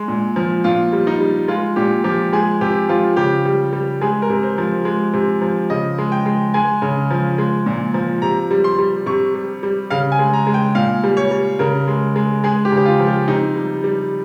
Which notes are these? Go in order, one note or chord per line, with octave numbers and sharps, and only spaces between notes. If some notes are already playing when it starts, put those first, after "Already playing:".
Already playing: G#3
A#2
F3
A#2 F4
G3
D#4
G3
G#3 F4
A#2 G4
F3 G4
G#3 G#4
C3 G4
F3 F4
C#3 G4
G3
G3
G#3 G#4
A#4
C3
C5
F3
G#3
C3
F3
C#3 D#5
G#3
G5
G#3
G#3 G#5
C#3
F3
G#3
A#2
F3
C3 A#5
G3
C6
G3
C3 C#6
G3
G3
C#3 F5
G#5
G#3
A#5
G#3
G5
A#2 F5
G3
C#5
G3
C#3 A#4
G#3
G#3
G#3 G#4
G4
C#3
G4
F4
F3
G4
C3 D#4
G3
G3